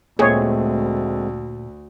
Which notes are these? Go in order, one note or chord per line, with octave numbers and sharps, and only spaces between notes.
D2 A#2 G#3 A3 C4 G#4 C#5